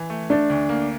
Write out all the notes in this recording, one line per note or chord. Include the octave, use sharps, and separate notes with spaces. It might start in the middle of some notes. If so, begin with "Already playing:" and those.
Already playing: E3
A3
A3 D4
D2
A#3